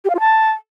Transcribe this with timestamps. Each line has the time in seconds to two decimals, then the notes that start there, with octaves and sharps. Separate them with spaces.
0.04 G4
0.10 F5
0.15 F4
0.20 A5